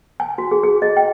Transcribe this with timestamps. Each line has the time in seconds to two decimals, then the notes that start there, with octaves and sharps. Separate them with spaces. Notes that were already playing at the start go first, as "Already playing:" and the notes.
0.20 G#5
0.38 F#4
0.51 G#4
0.63 G#4
0.82 D#5
0.97 G5